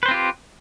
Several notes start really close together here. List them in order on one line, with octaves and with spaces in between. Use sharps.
B4 C5 C4 F4 G4